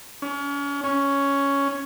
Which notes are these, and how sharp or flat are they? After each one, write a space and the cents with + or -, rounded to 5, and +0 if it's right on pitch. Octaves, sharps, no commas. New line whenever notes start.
C#4 +35
C#4 +5